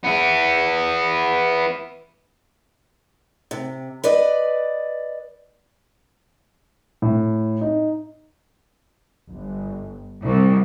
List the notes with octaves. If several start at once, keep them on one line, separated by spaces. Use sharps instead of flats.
B3 E4
C3
B4 D5 D#5
A2
D#4
G1
C2